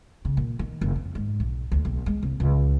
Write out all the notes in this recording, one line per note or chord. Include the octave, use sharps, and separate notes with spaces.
C#3
A#2
D#3
F#1
F2
G#2
B1
D2
B1
G#3
C2
C#2